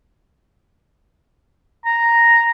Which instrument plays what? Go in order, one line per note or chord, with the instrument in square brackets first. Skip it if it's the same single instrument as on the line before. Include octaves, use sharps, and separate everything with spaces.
[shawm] A#5